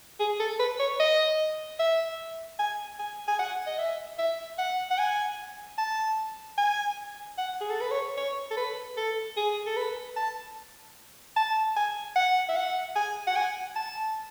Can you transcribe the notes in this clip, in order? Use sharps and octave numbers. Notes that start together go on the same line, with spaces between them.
G#4
A4
B4
C#5
D#5
E5
G#5
G#5
G#5
F#5
D#5
E5
E5
F#5
F#5
G#5
A5
G#5
F#5
G#4
A4
B4
C#5
C#5
A4
B4
A4
G#4
A4
B4
A5
A5
G#5
F#5
E5
F#5
G#5
F#5
G#5
A5